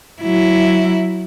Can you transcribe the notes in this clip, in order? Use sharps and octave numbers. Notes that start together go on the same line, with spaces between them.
F#3 E4